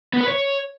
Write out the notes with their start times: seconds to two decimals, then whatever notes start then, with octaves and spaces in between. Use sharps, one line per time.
0.13 B3
0.21 B4
0.28 C#5